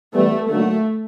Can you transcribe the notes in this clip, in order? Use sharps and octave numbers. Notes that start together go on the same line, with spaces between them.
E3 G3 A3 B3
D3 F#3 A3 A#3 D#4 F#4